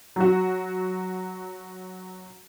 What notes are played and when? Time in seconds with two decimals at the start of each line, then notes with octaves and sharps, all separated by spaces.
0.16 F#3 F#4